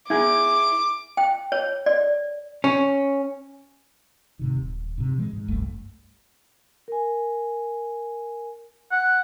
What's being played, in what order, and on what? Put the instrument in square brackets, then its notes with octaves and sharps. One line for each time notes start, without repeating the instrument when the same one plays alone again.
[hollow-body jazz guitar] E4 G#4 [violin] D6
[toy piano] G5
C#5
D5
[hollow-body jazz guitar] C#4
[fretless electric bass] G#2 C3 D#3
D#1
G#2 C3
B2 E3 G#3
G#2
F1 C2 G2 A3
[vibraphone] A#4 G#5
[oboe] F#5